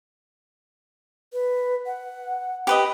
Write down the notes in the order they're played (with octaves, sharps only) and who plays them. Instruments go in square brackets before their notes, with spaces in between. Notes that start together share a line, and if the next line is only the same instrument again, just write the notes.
[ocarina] B4
F#5
[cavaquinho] G4 B4 D#5